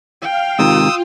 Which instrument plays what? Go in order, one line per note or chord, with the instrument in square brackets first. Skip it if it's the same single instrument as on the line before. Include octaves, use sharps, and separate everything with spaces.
[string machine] F5 [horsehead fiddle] G5
[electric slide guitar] G#2 C3 D#3 [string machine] F4 [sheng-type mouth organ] D#6 E6